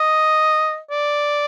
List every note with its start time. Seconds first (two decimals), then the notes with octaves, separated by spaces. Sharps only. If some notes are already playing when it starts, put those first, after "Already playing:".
Already playing: D#5
0.91 D5